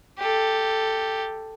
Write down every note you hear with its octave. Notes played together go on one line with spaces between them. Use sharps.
G4 A4